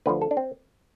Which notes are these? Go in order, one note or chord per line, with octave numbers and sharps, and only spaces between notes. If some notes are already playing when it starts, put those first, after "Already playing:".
D2 D3 F3 B4
A4
D4
C4